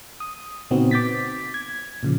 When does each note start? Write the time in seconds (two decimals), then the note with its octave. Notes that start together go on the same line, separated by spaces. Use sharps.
0.20 D#6
0.71 A#2 C#3 B3 C4 D#4 F#4
0.91 D6 G6 A6 B6
1.54 G#6
2.03 A#2 C#3 F3